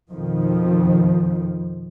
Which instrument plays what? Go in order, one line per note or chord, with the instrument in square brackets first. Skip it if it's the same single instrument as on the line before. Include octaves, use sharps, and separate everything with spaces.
[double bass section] F2 B2 D#3 F3